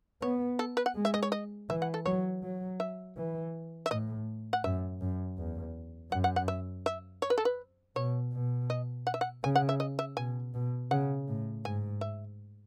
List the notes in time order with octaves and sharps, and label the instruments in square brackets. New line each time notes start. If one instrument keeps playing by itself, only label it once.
[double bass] B3 [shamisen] C#5
[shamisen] A4
B4
F#5
[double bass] G#3
[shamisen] E5
D#5
C#5
D#5
[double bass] E3 [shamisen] E5
[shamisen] F#5
A4
[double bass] F#3 [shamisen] C#5
[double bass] F#3
[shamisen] E5
[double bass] E3
[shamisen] E5
[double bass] A2 [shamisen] D#5
[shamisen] F#5
[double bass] F#2 [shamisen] E5
[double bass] F#2
E2
[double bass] F#2 [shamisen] F#5
[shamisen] F#5
F#5
E5
E5
C#5
B4
A4
B4
[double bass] B2 [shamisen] C#5
[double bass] B2
[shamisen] D#5
F#5
E5
F#5
[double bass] C#3 [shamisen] G#5
[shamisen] F#5
E5
D#5
E5
[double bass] B2 [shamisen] G#5
[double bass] B2
[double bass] C#3 [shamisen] F#5
[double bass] A2
[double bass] G#2 [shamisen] G#5
[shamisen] E5